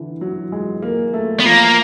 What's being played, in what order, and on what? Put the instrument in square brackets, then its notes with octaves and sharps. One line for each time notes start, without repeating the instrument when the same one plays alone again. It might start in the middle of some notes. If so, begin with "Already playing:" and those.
Already playing: [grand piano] D3 E3
F#3
G#3
A#3
A3
[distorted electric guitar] B3
[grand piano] F3 [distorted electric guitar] A#3